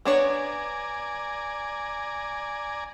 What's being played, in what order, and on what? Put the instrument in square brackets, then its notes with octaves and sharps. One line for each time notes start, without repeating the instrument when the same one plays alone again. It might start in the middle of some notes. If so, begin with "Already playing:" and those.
[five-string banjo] B3 D4 C#5 [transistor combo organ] D5 G#5 A#5